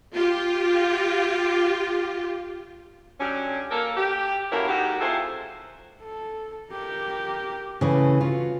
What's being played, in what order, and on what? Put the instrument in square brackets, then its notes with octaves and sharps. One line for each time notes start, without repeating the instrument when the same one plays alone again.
[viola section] F4 G4
[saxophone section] D3 F#3 G3 C#4
A#3 A4 A#4
G4
F#2 A2 A#3 E4 A#4 C#5
G#2 D#3 F#4 G4
C3 G#3 E4 F4 A4 C5
[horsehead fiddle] A4
G4 A#4
[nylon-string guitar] C#3 E3 [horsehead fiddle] A3
[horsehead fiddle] C#4 F#4 [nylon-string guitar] F4